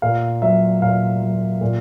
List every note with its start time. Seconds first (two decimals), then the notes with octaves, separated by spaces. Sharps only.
0.02 A#2 F5
0.42 F#3 E5
0.82 A#2 F5
1.22 F#3
1.61 A#2